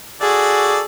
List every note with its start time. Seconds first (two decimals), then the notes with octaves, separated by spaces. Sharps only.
0.21 F#4 G#4 A4 D5